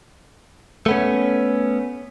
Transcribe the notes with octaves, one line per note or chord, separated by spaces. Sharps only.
A3 B3 C#4